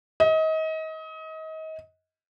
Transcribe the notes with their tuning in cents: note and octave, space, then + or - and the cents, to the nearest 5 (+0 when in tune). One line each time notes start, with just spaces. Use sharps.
D#5 +30